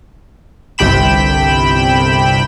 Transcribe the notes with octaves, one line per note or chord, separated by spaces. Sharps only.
G1 C2 C3 G5 B5 E7